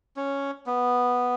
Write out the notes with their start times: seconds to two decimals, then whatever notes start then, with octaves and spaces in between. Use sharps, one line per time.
0.17 C#4
0.66 B3